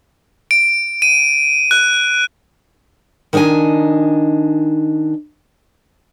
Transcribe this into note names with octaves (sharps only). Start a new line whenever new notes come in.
D7
D#7
F#6
D#3 D4 D#4 D5 G#5